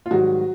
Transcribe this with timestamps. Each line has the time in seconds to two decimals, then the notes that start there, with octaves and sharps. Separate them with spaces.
0.06 F4
0.11 G#2 D#3 F#3 G3 F#4